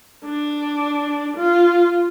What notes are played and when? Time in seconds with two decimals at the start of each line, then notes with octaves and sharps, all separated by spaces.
0.25 D4
1.37 F4